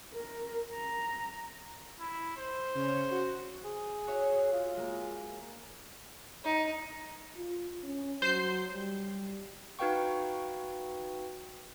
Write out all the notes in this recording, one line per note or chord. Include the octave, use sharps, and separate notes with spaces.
A#4
A#5
E4
C5
C#3 C#4 C#5
F#4
G#4
F#4 C#5 E5
F4
G#3 A#3
D#4
F4
C#4
F#3 C5 G6 C7
G3
D#4 F#4 B4 F5 G5 C#6